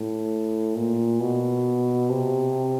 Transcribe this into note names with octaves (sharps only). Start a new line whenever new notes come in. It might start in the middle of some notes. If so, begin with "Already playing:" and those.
Already playing: A2
A#2
B2
C3